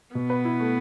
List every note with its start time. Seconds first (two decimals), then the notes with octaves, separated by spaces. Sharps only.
0.15 B2 B3
0.30 B4
0.45 E4
0.60 A3